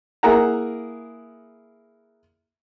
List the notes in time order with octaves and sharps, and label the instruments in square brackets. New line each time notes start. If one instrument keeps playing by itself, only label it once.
[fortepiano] A#3 E4 G#4 A#4 F#5 A#5